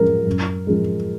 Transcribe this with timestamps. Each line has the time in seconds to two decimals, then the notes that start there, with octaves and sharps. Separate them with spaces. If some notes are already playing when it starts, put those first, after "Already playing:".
Already playing: F#2 F3 G#3 A#4
0.27 F#2
0.67 F3 G#3